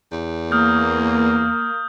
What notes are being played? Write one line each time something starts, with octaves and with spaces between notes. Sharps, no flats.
E2
A#3 D#6 F6 G6